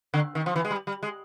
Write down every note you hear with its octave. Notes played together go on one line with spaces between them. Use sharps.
D3
D#3
F3
E3
G#3
G3
G3
G#3